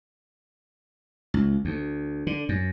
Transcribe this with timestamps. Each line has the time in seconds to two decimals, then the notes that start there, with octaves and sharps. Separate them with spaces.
1.34 C#2
1.65 D2
2.27 D3
2.49 F#2